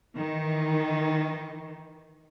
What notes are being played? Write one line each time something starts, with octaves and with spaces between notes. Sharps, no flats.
D#3 E3